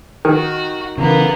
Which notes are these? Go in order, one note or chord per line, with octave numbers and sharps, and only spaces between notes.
D#3 D#4 F#4
C#3 E3 A#3 B3